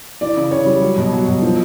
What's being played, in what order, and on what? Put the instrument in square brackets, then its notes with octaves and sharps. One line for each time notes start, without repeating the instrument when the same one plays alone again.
[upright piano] E3 D5
C#3
C#3 C#5
G3
F#3
B2
F#3
B2
F3